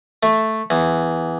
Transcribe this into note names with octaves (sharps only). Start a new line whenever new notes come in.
A3
E2